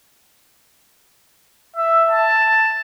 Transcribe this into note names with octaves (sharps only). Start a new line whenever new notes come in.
E5
A5